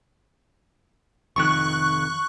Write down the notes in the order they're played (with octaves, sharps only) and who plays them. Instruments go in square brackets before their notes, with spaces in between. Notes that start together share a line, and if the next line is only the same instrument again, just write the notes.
[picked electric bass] F1 F2 D#3 [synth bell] C#6 F#6